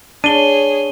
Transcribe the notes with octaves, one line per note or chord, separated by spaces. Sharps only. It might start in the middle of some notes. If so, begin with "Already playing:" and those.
D4 G#4 C#5 D#7 G7